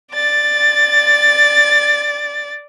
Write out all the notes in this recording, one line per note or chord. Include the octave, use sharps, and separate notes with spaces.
D5 A6